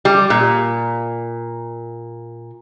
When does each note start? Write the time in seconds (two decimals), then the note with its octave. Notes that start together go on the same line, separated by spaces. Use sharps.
0.05 G3
0.30 A#2